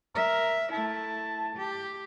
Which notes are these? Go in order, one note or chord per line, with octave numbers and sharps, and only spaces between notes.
A#4 E5
A3 E4 A5
G4